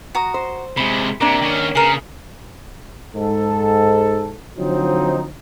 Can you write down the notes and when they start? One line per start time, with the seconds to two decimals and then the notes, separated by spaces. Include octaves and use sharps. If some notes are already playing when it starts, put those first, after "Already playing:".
0.15 F#4 A#5 D#6
0.34 C5
0.77 C3 G#3 B5
1.21 C3 A#3 D4
1.41 D#3 C#4
1.75 C#3 G#4 A#4
3.15 G#2 A4
4.58 D3 F3 F#3 C4 D#4